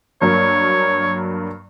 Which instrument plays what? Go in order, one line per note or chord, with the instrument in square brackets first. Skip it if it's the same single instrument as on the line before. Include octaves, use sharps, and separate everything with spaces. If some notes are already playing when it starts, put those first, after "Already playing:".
[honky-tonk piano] G2 F#3 A#3 [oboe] C#5